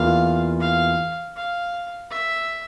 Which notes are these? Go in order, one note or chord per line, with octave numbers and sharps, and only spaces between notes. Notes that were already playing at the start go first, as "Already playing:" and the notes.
Already playing: E2 E3 A#3 F4 F5
F5
F5
E5